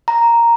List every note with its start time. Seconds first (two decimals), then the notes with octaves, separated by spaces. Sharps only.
0.08 A#5